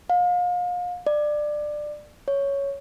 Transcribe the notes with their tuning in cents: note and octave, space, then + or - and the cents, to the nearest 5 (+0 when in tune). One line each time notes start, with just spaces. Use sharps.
F5 +35
D5 +20
C#5 +5